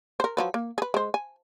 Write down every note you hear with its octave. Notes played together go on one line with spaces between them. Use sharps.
A#4 C5
F3 F#3 B4
A#3
G#4 B4
G#3 C5
G#5